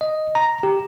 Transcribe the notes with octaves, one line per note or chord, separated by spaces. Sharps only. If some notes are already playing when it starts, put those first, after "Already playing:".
D#5
A#5
G4